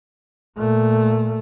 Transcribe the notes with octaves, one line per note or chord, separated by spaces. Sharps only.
A#2 A3